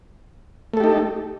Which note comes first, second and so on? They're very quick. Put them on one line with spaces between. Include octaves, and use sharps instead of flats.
A3 A4 G4 D#4